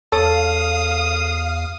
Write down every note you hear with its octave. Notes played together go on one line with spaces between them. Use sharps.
E2 A4 C#5 F5 D#6